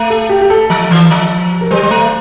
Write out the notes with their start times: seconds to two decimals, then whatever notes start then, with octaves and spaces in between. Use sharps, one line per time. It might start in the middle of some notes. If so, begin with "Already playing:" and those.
Already playing: A3
0.10 A4
0.29 G4
0.41 G4
0.50 A4
0.70 F3
0.91 E3
1.11 F3
1.61 A#4
1.71 G3 C5
1.83 G3
1.91 A3